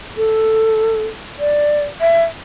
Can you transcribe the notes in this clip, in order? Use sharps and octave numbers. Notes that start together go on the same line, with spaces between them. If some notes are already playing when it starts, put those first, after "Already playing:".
A4
D5
E5